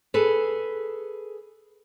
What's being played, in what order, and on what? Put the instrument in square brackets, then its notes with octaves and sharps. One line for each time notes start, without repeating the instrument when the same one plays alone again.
[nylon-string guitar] G#4 A4 B4